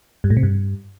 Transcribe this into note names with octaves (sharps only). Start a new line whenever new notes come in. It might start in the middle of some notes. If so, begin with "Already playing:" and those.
G2
A2
C3
G2